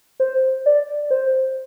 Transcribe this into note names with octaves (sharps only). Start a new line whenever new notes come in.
C5
D5
C5